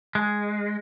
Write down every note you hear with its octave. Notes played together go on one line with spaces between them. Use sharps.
G#3